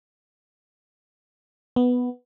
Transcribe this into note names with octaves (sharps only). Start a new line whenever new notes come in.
B3